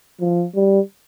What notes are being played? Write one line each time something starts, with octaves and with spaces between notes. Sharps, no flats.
F3
G3